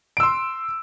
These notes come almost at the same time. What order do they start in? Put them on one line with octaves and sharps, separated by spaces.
D7 E6 C6